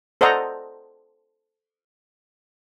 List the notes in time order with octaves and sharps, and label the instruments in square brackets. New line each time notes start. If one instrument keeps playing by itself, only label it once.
[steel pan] A4 C5 D5 D#5 F#5 A#5